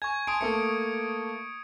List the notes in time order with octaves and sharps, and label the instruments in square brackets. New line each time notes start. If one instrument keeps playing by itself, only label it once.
[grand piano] G#5 [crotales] C#6 G#6
[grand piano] G#5 A5 C6 [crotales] D#6 D7
[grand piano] A3 A#3 A4 [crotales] C#7